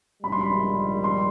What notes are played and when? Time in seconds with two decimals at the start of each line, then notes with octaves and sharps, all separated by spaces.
0.23 A#1 G#2 D#3 G3 B5
0.32 C6
0.41 B5
1.04 C6